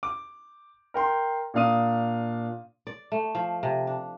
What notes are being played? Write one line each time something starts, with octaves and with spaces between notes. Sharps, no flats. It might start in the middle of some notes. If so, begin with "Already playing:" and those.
D6
A#4 G5 C6
A#2 A#3 D4 F5 D#6 D#7
D5
A3
F3
C3
D4